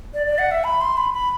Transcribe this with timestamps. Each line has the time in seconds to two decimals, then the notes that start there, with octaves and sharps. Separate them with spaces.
0.14 D5
0.27 D5
0.38 F#5
0.51 E5
0.64 B5
0.81 C6
0.97 B5
1.14 B5